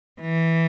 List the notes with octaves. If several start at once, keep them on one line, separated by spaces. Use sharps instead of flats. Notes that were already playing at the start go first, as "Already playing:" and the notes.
E3